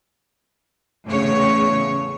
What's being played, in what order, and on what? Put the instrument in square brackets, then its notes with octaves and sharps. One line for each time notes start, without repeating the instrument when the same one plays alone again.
[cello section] E2 A2 C#3 C#5